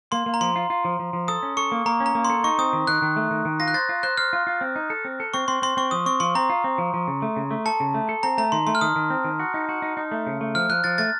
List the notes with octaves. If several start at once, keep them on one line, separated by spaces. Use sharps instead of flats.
A#3 C6
A#3
A#5
F3 C6
F4
F4
F3
F3
F3
A4 D#6
C#4
A4 C#6
A#3
A#3 A#5
C#4
A#5
A#3
C6
A4
D#4 C#6
C4 D#6
D#3
D#3 F#6
D#3
A3
D#3
D#3
F4 A#6
F#6
C5 A6
F4
C5 F#6
C5 F6
F4
F4
C4
D#4
A4
C4
A4
C4 C#6
C4 C6
C4 C6
C4 C#6
F3 D#6
C4 C#6
F3 C6
C4 A#5
F4
C4
F3
F3
C#3
A3
C#3
A3
A4 A5
C#3
A3
A4
C4 A#5
A3 A#5
D#3 C6
A3 C6
F6
D#3 D#6
D#3
C4
D#3
F#4
D#4
F#4
D#4
D#4
A3
C#3
A3
F3 F6
F3 F#6
F3 A6
A3 A6